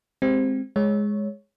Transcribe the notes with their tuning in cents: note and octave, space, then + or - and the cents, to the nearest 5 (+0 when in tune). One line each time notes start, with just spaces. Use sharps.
G#3 +0 C4 +0 G4 +0
G#3 +0 C#5 +0